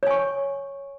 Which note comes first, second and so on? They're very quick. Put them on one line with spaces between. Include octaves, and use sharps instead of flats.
C#5 G#5 C#6